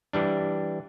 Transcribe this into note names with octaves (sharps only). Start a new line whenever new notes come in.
E3 G3 D4